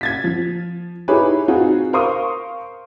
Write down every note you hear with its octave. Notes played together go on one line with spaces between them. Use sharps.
G#6 A6 B6
F3
D#4 E4 G4 G#4 B4 C#5
C4 D#4 F4 F#4 G#4
A#4 C5 F5 C6 C#6 D#6